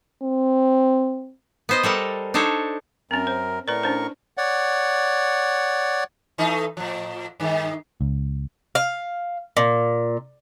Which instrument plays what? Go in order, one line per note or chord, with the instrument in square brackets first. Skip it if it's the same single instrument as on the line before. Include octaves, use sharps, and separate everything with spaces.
[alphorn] C4
[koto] B3 C5 D#5
G3 A4 A#4 F#5
D4 D#4 A4 C5 C#5
[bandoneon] F#2 A#4 [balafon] C4 C#4
[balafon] C5
[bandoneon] A2 A#4 C#6 [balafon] B4 D5
[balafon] C#4 D4 C5
[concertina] C#5 D5 F#5
[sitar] E3 A3 D#4
A2 F3
G2 D#3
[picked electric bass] C#2
[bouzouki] F5
A#2